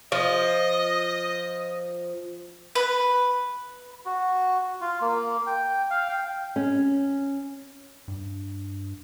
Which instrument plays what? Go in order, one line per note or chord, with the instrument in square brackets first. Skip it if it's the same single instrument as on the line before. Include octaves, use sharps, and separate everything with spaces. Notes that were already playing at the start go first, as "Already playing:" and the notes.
[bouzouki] F3 [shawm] D#5
[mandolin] B4
[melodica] F#4
F4
A#3
G5
F5
G5
[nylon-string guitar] C#4
[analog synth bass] G2